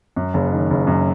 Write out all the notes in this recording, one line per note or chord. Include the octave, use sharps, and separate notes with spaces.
F#2
F#1
D#3
F#1
F#2